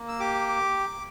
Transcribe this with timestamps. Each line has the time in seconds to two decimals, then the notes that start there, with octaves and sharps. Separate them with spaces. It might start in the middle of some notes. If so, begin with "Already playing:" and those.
Already playing: A#3
0.08 E6
0.20 G4 D6